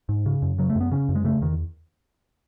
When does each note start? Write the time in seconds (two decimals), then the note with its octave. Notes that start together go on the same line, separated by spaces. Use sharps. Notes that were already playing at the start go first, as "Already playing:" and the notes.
0.09 G#2
0.26 C#3
0.42 F#2
0.59 C#3 F#3
0.70 A3
0.76 F#2 B3
0.91 C#3 C#4
1.09 F#2
1.15 G#3
1.24 C#3 A3
1.41 E2 D#3